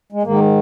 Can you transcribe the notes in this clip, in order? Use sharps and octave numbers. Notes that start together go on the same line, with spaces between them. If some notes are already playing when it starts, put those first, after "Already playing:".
G#3
G#2 D#3 A#3